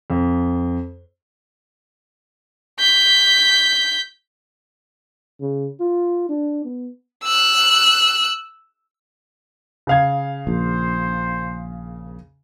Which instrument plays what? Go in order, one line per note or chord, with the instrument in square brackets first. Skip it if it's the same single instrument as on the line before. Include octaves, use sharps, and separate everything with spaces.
[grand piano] F2
[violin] G6 B6
[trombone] C#3
F4
D4
B3
[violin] E6 F#6
[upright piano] C#3 F5 G#6
[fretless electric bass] A#1 [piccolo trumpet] C5